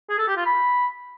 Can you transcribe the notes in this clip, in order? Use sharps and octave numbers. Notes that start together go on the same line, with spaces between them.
G#4
A4
G4
F4
B5